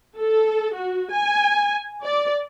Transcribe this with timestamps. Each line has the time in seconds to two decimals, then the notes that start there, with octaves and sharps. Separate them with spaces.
0.18 A4
0.74 F#4
1.12 G#5
2.03 D5